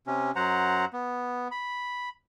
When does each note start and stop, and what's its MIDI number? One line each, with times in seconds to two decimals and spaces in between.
0.07 0.31 48
0.07 0.31 61
0.36 0.85 42
0.36 0.85 54
0.36 0.85 72
0.36 0.85 78
0.36 0.85 82
0.93 1.48 59
1.51 2.09 83